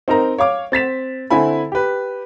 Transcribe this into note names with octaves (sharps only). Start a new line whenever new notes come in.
C4 D#4 A#4 A#5
C#5 F5 D6
C4 A6 B6 E7
D3 C4 E4 G#5 B5
G4 B4